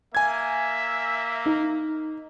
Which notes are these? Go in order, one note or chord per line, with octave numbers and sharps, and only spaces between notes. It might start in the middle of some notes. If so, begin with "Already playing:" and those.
A#3 E5 G#5 G#6
D#4